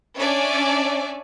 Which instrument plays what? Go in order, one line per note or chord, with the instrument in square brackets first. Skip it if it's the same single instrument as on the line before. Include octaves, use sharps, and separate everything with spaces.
[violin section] C#4 D4 C#5 D5 E5 G#5